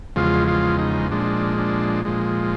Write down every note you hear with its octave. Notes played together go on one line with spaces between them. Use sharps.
E2 C#3 F3 G#3 F4
F4
D#4
A#2 F3 G#3 D4
D4
A#2 F3 G#3